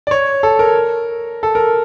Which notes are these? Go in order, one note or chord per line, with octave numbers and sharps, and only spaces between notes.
D5
C#5
A4
A#4
A4
A#4